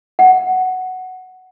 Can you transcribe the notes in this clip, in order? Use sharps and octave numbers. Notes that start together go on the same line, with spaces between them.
F#5